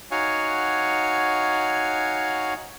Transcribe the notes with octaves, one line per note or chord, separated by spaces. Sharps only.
D#4 F#4 C#5 F5 F#5 G#5